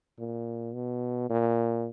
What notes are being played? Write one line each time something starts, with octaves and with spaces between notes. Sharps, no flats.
A#2
B2
A#2